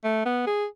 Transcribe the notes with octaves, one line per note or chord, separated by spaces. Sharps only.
A3
B3
G#4